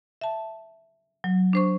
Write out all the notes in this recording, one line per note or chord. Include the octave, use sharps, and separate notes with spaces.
E5 A5
F#3
D4 C5 C#6